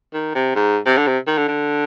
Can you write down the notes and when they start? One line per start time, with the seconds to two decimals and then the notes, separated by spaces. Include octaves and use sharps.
0.13 D#3
0.35 C3
0.55 G#2
0.86 C3
0.97 D3
1.07 C3
1.27 D#3
1.37 D3
1.48 D3